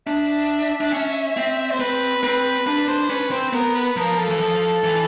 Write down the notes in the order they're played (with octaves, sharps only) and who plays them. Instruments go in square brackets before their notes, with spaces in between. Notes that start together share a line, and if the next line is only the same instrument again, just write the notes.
[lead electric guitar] D4 [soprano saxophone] E5
[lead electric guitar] D4
C#4
C4
[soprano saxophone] C5
[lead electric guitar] C4 [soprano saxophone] B4
[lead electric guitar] C4 [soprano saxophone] B4
[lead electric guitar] D4 [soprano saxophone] B4
[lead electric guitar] D4 [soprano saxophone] C5
[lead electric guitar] C#4 [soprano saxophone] B4
[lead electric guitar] C4 [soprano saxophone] C5
[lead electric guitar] B3 [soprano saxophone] A#4
[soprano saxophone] B4
[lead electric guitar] F3 [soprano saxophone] A#4
[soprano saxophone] A4
[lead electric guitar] E3
F3
E3